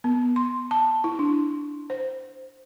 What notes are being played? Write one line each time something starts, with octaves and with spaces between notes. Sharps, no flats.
B3
C6
A5
E4
D4
C5